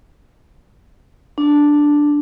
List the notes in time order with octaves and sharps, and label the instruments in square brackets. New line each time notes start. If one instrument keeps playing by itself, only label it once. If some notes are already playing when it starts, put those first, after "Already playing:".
[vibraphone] D4